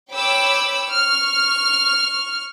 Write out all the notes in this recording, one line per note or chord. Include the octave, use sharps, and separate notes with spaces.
C#5 G5 B5 D6 E6
C#6 F6